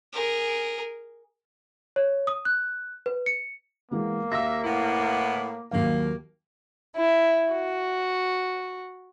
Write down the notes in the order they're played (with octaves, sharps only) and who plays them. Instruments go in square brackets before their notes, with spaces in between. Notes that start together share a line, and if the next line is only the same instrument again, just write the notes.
[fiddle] G#4 A#4
[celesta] C#5
D#6
F#6
B4
C#7
[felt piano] E3 G#3 B3 [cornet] A#3
[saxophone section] D#2 E5 [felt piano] F5 D6 A#6
[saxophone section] A2 B3 E4
[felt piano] D#2 F#3 F5 [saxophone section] A#3
[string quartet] E4
F#4